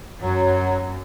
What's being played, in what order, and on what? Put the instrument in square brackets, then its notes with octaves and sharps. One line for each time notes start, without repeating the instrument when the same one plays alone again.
[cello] F#2 [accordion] F#3